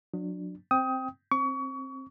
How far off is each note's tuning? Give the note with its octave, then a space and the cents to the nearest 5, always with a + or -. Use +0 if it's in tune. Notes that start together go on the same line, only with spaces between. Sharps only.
F#3 -30 D4 +10
C4 +0 G5 +0 D#6 +25
C4 +20 C#6 +30